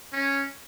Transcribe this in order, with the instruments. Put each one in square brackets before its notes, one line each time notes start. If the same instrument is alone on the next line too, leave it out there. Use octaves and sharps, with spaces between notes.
[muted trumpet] C#4